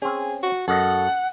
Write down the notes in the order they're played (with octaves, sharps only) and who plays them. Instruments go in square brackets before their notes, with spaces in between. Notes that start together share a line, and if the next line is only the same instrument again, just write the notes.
[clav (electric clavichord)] C4 C#4 [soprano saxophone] G#4
[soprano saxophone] F#4
[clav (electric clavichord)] F#2 D#5 [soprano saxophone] A4 [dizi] F#5